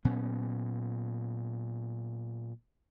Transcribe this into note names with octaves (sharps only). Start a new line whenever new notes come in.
A#2 F#3 B3 C#4